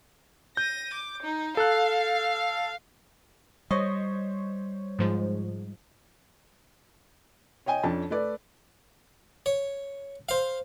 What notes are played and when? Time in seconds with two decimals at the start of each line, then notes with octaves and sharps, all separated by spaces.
0.57 G6 A#6 D#7
0.94 D6
1.23 D#4
1.57 A4 F5 F#6
3.71 G3 C5 C#5 D#5 C#6
4.99 G#2 F3 G#3
7.66 C#5 D#5 G5 G#5
7.83 F2 C#4 D4 A5
8.10 A3 B4 D5
9.46 C#5
10.29 C5 F5